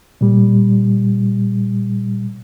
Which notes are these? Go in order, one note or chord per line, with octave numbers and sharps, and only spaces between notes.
A#2 G3